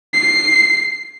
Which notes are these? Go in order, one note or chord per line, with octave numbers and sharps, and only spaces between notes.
C7